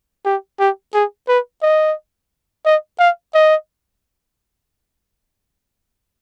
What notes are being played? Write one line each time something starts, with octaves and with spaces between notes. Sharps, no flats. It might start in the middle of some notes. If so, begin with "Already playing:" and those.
G4
G4
G#4
B4
D#5
D#5
F5
D#5